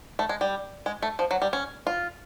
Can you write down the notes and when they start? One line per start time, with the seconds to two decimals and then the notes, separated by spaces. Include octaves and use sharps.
0.19 A3
0.29 G#3
0.41 G3
0.86 G#3
1.02 A3
1.19 F3
1.31 F#3
1.42 G3
1.53 C#4
1.87 F4